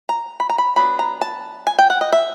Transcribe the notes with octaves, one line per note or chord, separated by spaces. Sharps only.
A#5
B5
A#5
B5
F#3 B3 D4 B5
A#5
A5
G#5
G5
F#5
D#5
E5